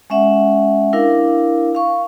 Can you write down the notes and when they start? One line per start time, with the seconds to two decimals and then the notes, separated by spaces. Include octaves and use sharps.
0.10 G#3 C#4 E5 F#5
0.93 D4 E4 A#4 F5
1.75 F5 C#6